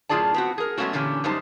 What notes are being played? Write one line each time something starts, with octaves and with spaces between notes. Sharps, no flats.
F#2 A2 F4 G#4 D5 A5
B3 C4 F#4
G#4 A#4
F#3 G#3 A3 B3 C#4 F#4
A#2 D3 E3 C#4 G4
F#2 G3 G#3 D#4 C5 A5